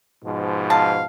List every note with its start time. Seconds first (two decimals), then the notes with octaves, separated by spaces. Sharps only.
0.25 G#2 B2 F3
0.70 F5 A5